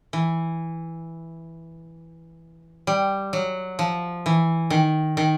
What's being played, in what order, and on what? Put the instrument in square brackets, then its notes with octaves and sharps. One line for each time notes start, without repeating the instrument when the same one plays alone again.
[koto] E3
G3
F#3
F3
E3
D#3
D#3